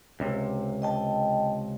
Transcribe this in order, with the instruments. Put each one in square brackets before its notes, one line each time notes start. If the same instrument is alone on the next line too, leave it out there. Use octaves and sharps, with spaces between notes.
[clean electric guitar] C#2 C3
[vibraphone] D#5 G5 A5